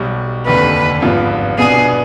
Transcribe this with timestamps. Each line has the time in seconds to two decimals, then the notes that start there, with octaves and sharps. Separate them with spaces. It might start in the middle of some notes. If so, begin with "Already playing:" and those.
Already playing: B1 B2 G3
0.46 F1 D#2 D3 B4
1.02 G#1 G2 F3 B3 F4
1.58 C2 B2 B3 D4 G#4